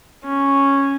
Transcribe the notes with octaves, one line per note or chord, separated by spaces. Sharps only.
C#4